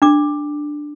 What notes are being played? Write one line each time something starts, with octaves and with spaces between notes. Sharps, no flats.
D4 D6